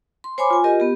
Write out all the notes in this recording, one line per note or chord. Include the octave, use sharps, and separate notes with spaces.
C6
C5 C#5 G#5 B5 C6 D6
F4 G#5
F4 G4 A#4 D#5
B3 G4